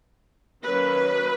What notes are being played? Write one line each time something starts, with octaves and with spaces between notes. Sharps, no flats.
D#3 F#3 A#3 C#4 B4